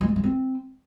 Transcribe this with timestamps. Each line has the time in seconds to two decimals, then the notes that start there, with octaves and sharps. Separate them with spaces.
0.01 G#3
0.08 G3
0.16 G#3
0.24 C4